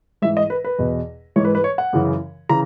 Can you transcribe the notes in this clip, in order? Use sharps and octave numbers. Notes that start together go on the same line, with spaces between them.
G#2 E3 E5
D#5
B4
B4
E2 B2
G#2 E3 C#5
B4
B4
C#5
F#5
F#2 C#3 E3
C#3 E3 A#5